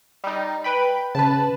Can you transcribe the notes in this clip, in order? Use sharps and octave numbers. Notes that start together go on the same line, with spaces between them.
G3 D#4
B4 G5 B5
C#3 B4 A5